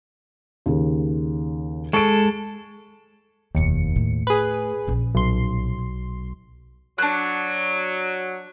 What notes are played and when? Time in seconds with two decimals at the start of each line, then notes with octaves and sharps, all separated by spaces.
0.66 D#2 C#3
1.93 G#3 A4 C#6 D7
3.55 F1 D#2 B2 C#7
3.96 A2
4.27 G#4 B4
4.87 A#1 C#4
5.15 B1 C6
6.98 F#3 D4 F#6